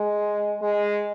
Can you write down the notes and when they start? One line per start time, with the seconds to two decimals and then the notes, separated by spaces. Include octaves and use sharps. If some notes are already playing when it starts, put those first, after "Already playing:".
Already playing: G#3
0.62 G#3